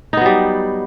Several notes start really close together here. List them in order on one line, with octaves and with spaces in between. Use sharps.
D#4 B3 F#3 G3